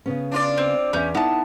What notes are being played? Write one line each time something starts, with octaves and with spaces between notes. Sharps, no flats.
C#3 B3 C#4
D4 F4 D5
C4
E2 C#4 E5 G6
B3 D#4 E4 A5